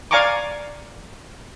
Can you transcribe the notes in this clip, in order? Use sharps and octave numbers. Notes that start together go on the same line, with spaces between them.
D5 F5 G#5 A#5 C#6 D6